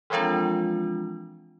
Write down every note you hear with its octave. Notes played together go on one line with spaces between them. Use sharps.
E3 F3 G#3 C4 D4 F4